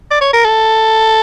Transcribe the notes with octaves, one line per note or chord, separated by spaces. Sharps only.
D5
C#5
A#4
A4